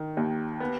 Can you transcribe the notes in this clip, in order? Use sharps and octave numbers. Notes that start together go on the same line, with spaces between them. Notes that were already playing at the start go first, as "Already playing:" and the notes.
Already playing: D#3
D#2
B3